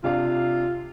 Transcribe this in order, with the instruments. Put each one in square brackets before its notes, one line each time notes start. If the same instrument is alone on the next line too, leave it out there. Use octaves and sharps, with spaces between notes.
[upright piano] C3 D4 F5 [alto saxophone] F4